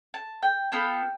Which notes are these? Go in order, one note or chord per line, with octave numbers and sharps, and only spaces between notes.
A5
G5
B3 F4 A4 G5